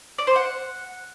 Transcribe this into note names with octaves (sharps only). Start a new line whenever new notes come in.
D5
C5
F#5